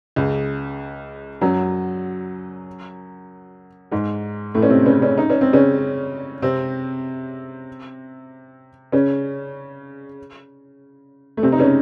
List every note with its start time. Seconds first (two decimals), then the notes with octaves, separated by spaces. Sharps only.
0.16 C#2 C#3
1.41 F#2 F#3
3.92 G#2 G#3
4.55 A2 A3
4.62 C#4
4.70 C3 C4
4.86 C#3 C#4
5.02 C#3 C#4
5.18 D#4
5.30 C#4
5.41 C4
5.53 C#3 C#4
6.42 C3 C4
8.92 C#3 C#4
11.37 A3
11.43 C3 C4
11.52 D#4
11.59 C#3 C#4